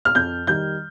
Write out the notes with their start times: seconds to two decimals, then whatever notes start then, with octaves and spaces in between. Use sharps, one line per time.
0.05 F6
0.15 F2 G6
0.47 D#3 G3 G6